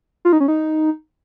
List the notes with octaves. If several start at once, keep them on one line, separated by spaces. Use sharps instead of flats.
F4
D#4
C#4
D#4